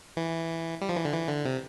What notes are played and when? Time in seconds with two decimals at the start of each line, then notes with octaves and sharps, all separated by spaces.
0.17 E3
0.81 G3
0.89 F3
0.97 E3
1.05 D3
1.14 E3
1.29 D3
1.45 C3